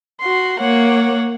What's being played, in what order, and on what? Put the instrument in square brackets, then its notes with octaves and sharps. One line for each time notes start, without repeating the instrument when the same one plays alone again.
[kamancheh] F#4 C6
[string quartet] A#3 [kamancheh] C#5 F#5